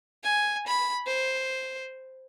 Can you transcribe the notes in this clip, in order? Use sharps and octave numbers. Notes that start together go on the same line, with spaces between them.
G#5
B5
C5